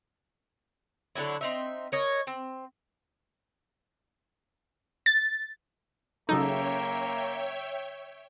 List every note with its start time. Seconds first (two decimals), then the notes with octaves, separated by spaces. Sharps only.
1.15 D3 F#3 D4 E4
1.41 C4 D#4 E5
1.92 A#4 C#5 D#5
2.27 C4
5.06 A6
6.29 C#3 F#3 A#3 D#4 A4 C#5 E5 G5